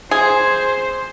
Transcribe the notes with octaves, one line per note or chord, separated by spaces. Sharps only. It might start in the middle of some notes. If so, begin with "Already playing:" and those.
G#4 C5